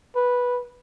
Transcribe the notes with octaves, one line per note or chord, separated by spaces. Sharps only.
B4